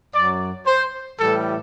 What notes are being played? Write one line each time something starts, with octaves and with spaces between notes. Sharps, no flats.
F#2 F#3 D5
C5
A2 E3 G3 A4